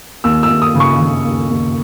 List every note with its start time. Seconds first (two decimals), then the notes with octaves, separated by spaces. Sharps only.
0.24 D#2 E6
0.43 E6
0.49 D#2
0.62 D#6
0.75 C#3
0.80 C#6
1.00 C#3
1.24 D#2
1.50 D#2